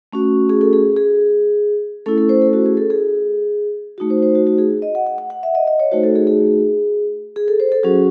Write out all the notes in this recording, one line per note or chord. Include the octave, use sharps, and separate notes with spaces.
A3 C#4 F#4
G#4
A4
G#4
G#4
A3 C#4 E4 A4
A4
C5
A4
F#4
G#4
A4
G#4
A3 D#4 F#4
C5
C5
F#4
F#4
G#4
D#5
F#5
F#5
F#5
F#5
E5
D#5
D#5
C#5
A3 D#4 F#4 C5
A4
G#4
G#4
G#4
A4
C5
A4
F#3 C#4 F#4 G#4